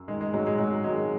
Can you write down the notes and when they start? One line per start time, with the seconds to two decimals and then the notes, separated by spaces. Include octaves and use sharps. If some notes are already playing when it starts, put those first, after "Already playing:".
Already playing: F#2
0.08 D#3 G#3
0.21 G#3
0.34 G#2 F#3
0.47 G#3
0.58 G#2 F#3
0.84 D#3 G#3